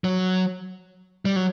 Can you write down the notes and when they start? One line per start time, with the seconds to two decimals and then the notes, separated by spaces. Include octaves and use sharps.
0.04 F#3
1.25 G3
1.36 F#3